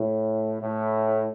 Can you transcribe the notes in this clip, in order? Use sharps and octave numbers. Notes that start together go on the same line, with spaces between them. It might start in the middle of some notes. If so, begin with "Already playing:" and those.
Already playing: A2
A2